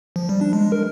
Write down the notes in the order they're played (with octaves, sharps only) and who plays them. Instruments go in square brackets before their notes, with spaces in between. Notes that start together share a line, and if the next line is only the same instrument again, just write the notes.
[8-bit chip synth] F3
G3
D4
G#3
A#4